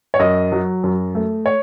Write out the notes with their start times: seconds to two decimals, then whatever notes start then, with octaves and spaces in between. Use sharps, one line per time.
0.14 C#5
0.19 F#2 D#5
0.52 F#3
0.84 F#2
1.15 A3
1.46 C#5